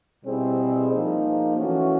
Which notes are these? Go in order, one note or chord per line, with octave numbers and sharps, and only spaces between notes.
B2 G3 C4 E4 G#4
F3 A#3 D#4
E3 A3 C#4 F#4